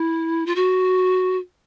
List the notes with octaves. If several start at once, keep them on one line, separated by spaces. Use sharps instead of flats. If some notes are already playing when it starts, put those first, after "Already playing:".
Already playing: E4
F4
F#4